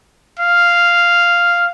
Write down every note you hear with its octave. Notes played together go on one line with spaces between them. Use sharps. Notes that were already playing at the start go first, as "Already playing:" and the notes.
F5